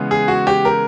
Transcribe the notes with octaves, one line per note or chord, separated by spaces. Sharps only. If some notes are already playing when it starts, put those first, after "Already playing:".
Already playing: C#3 E3 G#3 B3
G#4
F#4
G4
A#4